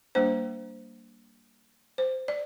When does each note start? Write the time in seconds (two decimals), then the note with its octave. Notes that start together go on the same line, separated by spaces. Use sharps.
0.15 G3 A#3 D4 C5
1.98 C5
2.28 D5